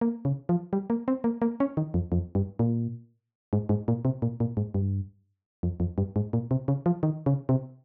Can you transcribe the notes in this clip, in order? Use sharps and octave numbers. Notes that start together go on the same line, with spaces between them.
A#3
C#3
F3
G3
A#3
C4
A#3
A#3
C#4
D#3
F2
F2
G2
A#2
G#2
G#2
A#2
C3
A#2
A#2
G#2
G2
F2
F2
G2
G#2
A#2
C3
C#3
F3
D#3
C#3
C3